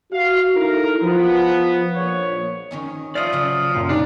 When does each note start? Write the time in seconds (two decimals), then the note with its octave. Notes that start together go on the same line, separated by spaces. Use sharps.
0.11 F#4 F5
0.54 D#4 E4 A4 A#4
1.01 F3 B3
1.95 A#1 C#5
2.71 D#3 C#4 D#4
3.15 F3 D5 E5 F5 D#6
3.32 C#3 F#3
3.75 F#2 A#2
3.89 C3 D4 D#4 D5